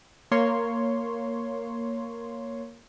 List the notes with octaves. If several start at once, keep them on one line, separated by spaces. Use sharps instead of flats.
A#3 C#5 C6